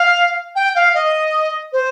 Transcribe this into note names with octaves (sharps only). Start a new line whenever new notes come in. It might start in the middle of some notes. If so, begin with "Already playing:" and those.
Already playing: F5
G5
F5
D#5
C5